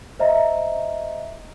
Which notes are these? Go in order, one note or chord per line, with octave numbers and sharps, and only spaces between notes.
C5 D#5 E5 A#5